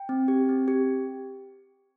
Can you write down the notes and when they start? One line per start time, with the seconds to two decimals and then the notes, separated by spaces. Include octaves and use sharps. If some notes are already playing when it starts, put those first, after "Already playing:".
Already playing: G5
0.09 C4
0.28 G4
0.49 C4
0.68 G4